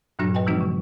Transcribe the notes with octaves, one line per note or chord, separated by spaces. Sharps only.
G2 A#2 F#3 D4 F#4 A#6
B4 D#5 G5 G#5
E3 F3 G#3 C4 D#4 F#4
C#3